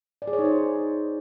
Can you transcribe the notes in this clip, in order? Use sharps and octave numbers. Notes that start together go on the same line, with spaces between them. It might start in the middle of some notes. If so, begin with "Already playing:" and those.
D5
G#4
C#5
D#4
C5